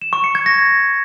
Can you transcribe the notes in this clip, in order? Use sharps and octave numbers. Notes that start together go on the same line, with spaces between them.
E7
C#6
C#7
G#6
A#6